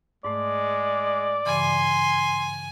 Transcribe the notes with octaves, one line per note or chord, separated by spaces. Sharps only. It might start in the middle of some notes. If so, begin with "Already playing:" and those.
G#2 G#3 A3 D5
G2 C#3 E3 G#5 C6